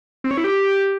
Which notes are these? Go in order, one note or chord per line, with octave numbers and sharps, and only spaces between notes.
C4
C#5
E4
G4